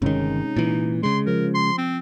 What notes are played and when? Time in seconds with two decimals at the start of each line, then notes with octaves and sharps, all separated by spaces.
0.02 G1 C3 D#3 G#3 C#4 D#4
0.57 A#2 E3
1.03 C#3 G#3 C6
1.27 F3 A#4
1.55 C6
1.78 C4